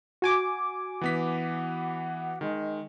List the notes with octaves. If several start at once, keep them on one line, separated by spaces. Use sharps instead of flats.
F#4 G#5 D6
E3 B3 F#5 B6
D#3 G#3